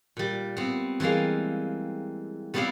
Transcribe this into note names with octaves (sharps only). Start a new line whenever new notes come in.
A#2 G3
B3 C4
E3 G3 G#3 A#3 F5
G3 B3 C4 E4 D5 F5